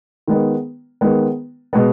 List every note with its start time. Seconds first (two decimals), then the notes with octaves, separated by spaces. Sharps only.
0.28 D#3 G#3 B3
1.01 D#3 G#3 B3
1.73 B2 G#3 B3